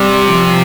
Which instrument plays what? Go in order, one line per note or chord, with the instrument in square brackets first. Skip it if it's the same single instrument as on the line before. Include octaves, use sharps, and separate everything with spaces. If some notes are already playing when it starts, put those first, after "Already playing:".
Already playing: [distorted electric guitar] C3 [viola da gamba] G3
[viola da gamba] F3